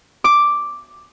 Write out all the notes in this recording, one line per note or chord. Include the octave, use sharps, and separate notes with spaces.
D6